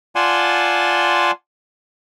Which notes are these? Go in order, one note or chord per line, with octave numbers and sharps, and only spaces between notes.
F4 D5 F#5 G#5 A5 C6